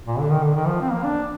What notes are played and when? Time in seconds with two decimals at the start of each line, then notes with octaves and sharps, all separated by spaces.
0.07 A#2
0.19 D3
0.31 D#3
0.43 D3
0.55 D#3
0.67 F3
0.82 C4
0.92 A#3
1.04 D4